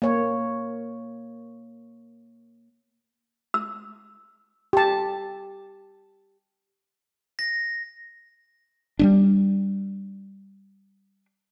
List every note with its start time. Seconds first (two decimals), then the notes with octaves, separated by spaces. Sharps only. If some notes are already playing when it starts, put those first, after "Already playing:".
0.02 A#3 C#5
3.54 E6
4.73 G4 A5
7.39 A#6
8.99 G3 G#3 D4